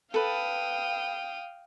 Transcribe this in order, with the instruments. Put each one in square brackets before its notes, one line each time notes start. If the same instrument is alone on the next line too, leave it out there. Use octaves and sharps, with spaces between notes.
[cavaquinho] A4 B4 [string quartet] F5 G5 D#6